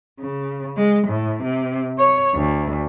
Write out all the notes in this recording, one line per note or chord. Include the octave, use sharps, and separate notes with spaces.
C#3
G#3
A2
C3
C#5
D2